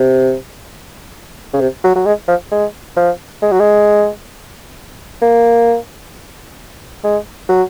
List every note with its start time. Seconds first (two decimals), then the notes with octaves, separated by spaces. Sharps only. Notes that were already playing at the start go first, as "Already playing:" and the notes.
Already playing: C3
1.53 C#3
1.60 C3
1.84 F#3
1.96 F#3
2.06 G#3
2.28 F3
2.51 G#3
2.97 F3
3.42 G#3
3.52 F#3
3.60 G#3
5.22 A#3
7.04 G#3
7.49 F#3